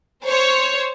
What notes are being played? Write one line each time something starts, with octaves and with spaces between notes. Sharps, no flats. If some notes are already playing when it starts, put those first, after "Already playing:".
C5 C#5